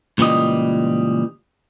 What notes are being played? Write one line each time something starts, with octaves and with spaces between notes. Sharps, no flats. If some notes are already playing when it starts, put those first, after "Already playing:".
C#2 A#2 E3 G3 D#5